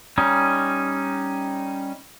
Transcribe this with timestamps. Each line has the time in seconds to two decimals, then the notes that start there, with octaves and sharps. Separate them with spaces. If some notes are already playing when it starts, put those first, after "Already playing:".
0.18 G3 C#4 D#4